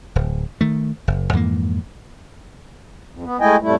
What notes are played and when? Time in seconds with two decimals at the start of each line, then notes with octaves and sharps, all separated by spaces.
0.16 D1
0.61 D#3 A3
1.08 F#1
1.33 F2 G#2 E3 A#3
3.11 F2
3.24 B3
3.41 G#3 A3 E4 D#5 G5 G#5
3.62 F2 A2 G3 A3 E4